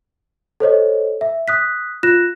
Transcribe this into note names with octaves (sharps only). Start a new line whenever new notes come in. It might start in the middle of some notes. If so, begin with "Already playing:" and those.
A4 C5 C#5 D#5
E5
D#6 F#6 B6
F4 F#6 A#6 E7